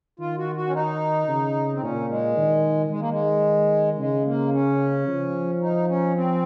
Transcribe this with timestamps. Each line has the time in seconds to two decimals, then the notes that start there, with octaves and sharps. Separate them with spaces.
0.19 D#3 F4
0.37 F#4
0.55 F#4
0.67 C#4
0.74 D#4
1.28 C#3
1.73 C4
1.82 A#2 C#4
2.09 G#3
2.37 D#3
2.90 D#3 G#3
3.00 A#3
3.10 G#3
3.98 C#3 G#3
4.26 A#3
4.53 C#4
5.08 F3
5.61 D#4
5.89 C#4
6.15 C4